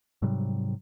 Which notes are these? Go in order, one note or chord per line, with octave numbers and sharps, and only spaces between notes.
G#2 C3 F#3 G3